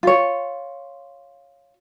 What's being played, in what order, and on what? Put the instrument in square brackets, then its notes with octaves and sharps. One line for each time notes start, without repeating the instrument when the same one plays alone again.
[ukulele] F4 C#5